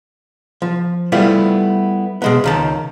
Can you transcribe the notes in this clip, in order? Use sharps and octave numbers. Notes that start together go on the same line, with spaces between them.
F3
G3 A3 B3 E4 F4
B2 G#3 B3
C#2 D#3 A5